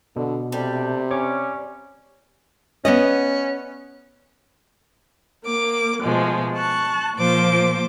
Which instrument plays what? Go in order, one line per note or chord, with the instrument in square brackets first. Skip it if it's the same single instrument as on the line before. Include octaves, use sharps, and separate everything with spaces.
[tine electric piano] B2 [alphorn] D3
[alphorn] C3 [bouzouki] G3 [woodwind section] A3 D4 G5
[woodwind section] C#4 [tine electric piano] C#5 C#6 D6
[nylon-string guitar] B3 D5 D#5 [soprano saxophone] C#4
[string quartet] A#3 D6
B2 F3 G#3 A3
A5 C#6 F#6
A#2 F3 C5 D6